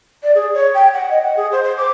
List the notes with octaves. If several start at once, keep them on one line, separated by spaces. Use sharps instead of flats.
D5
G#4
C#5
G5
F#5
D#5
F#5
G#4
C5
C5
D6